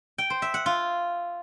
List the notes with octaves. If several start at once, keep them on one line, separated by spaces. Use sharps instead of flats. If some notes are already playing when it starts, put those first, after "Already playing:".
G5
C5
E5
F#5
F4